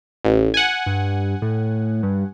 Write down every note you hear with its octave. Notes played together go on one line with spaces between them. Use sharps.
A1
F#5 G#5
G2
A2
G2